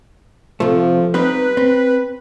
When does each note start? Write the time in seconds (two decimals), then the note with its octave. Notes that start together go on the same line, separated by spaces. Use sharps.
0.60 C3 F3 A3 A4
1.14 G3 C4 D#4 B4
1.57 C4